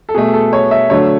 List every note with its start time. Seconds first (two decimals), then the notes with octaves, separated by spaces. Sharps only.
0.09 A4
0.14 B2 A3 G#4
0.34 A4
0.53 C#5
0.71 E5
0.90 D3 F#3 A3 C#5